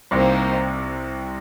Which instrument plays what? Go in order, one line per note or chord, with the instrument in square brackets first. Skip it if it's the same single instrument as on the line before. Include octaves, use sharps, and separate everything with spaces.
[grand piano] C2 C3 [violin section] A#3 D#4 G4 C5